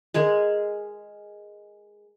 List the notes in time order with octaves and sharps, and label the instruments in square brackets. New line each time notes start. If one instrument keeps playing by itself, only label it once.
[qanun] G#3 G#4 A#4